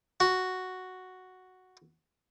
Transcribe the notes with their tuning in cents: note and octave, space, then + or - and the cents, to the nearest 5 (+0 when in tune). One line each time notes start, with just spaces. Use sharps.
F#4 +0